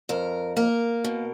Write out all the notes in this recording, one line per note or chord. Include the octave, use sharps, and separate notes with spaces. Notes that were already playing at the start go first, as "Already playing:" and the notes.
F2 A#4
A#3 A#4
B2